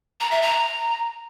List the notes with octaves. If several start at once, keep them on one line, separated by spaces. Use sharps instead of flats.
A#5
E5
A#5